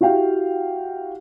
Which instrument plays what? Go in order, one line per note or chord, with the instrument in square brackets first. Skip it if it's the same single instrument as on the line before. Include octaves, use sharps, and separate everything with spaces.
[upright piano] E4 F#4 G4 F5 G5